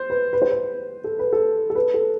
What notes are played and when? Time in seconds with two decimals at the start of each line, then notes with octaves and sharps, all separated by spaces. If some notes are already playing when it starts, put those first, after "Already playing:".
Already playing: C5
0.10 B4
0.33 B4
0.42 C5
0.51 B4
1.04 A4
1.19 B4
1.33 A4
1.70 A4
1.75 B4
1.94 A4